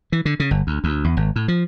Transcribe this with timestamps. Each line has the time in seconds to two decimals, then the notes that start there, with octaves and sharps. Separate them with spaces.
0.12 E3
0.25 D3
0.40 C#3
0.51 G1
0.67 D2
0.84 D2
1.04 E2
1.17 G#1
1.36 A2
1.48 F3